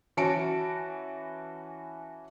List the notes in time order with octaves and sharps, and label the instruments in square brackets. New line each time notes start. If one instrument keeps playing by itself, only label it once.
[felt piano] E3 C#4 F#4 A5 C#7 D7